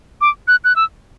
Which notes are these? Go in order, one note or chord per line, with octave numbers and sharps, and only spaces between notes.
D6
F#6
F#6
E6